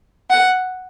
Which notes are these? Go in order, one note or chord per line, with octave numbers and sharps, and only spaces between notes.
F#5